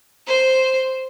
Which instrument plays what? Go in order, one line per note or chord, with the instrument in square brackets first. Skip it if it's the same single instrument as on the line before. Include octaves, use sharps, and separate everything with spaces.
[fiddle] C5